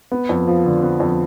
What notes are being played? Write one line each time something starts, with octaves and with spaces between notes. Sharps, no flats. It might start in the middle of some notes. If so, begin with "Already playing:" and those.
B3
F2
F3
D3
B3
F2